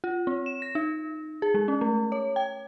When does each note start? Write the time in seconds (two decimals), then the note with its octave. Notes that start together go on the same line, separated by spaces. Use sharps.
0.04 F4
0.27 C4
0.46 E7
0.62 A#6
0.75 D#4
1.42 G#4
1.54 G#3
1.68 C#4
1.81 A3
2.12 C#5
2.36 G5